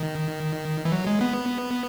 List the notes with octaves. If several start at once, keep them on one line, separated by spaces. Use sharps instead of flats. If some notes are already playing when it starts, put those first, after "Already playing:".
Already playing: D#3
E3
F#3
G#3
B3